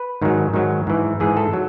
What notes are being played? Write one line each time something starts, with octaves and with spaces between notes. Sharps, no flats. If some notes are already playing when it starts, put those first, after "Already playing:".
Already playing: B4
G#2 D#3 F#3
G#2 D#3 F#3
G#2 E3
G#2 E3 G#4
A4
F#3